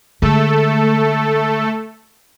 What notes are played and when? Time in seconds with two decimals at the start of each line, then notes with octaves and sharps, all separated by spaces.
0.22 D3 G#3 A3 A4